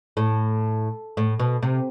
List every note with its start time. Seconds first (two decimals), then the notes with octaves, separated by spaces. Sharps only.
0.17 A2
1.17 A2
1.40 B2
1.62 C3